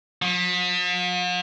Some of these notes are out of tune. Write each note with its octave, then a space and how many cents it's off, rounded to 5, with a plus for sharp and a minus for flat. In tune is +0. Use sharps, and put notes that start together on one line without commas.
F3 +45